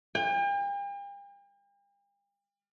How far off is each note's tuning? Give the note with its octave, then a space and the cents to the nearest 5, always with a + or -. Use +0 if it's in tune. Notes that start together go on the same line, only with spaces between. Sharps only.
G5 +45